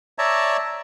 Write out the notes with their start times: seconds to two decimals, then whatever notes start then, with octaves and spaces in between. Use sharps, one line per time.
0.18 C#5 D5 E5 A5 A#5